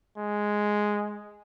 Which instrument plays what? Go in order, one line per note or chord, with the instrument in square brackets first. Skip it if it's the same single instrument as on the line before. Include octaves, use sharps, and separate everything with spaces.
[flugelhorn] G#3